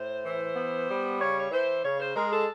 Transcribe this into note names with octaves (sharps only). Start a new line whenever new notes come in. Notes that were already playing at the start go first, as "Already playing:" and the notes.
Already playing: A2 C5
E3
B3
G3
C#3 C#5
C#5
E3 C5
C#3 C#5
C5
G#3 A#4
A4